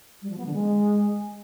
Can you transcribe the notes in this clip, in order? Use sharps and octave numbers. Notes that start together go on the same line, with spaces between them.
G3
F3
B3
D3
G#3